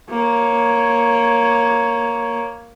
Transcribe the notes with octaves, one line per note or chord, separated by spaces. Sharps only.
A#3 C#5